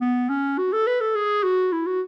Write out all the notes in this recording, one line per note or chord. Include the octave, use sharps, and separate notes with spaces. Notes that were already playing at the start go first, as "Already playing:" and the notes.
B3
C#4
F#4
A4
B4
A4
G#4
F#4
E4
F#4